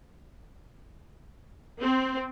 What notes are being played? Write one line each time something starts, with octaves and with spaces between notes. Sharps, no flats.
C4